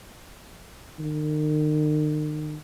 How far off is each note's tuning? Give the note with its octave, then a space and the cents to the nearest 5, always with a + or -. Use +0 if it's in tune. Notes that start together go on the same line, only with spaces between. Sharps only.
D#3 -40